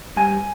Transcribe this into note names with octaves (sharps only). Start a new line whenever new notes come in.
G2 G#5